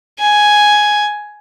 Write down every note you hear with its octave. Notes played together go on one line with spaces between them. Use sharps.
G#5